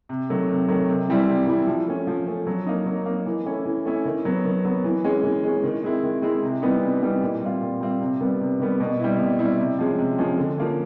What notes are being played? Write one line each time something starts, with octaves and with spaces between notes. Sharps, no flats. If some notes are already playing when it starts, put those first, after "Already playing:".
C3
D#3 F#3 A3
C3
D#3 F#3 A3
C3
E3 G3 C4 E4
C3
E3 G3 C4 E4
F3
A3 C#4
F3
A3 C#4
F#3
A#3 D#4
F#3
A#3 D#4
E3
A3 C#4 E4
E3
A3 C#4 E4
D#3
F#3 B3
D#3
F#3 B3
E3
G#3 C#4
E3
G#3 C#4
D#3
G#3 C4 E4
D#3
G#3 C4 E4
C3
E3 G3 B3 D#4
C3
E3 G3 B3 D#4
A#2
G3 C4 F4
A#2
G3 C4 F4
C3
D#3 G3 B3
C3
D#3 G3 B3
B2
G3 C4 E4
B2
G3 C4 E4
C3
F3 G#3 C#4
C3
F3 G#3 C#4
D3
F3 A#3 C#4